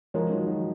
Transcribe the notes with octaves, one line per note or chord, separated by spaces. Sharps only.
F3 G#3 F4 A#4 C#5
D#3 F#3
D#3 F#3